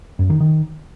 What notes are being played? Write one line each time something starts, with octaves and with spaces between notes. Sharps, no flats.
F#2
D#3
D#3